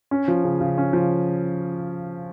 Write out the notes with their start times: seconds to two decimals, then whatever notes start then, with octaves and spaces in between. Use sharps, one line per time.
0.11 C#4
0.28 F3
0.44 C#3
0.61 C#3
0.78 C#4
0.93 F3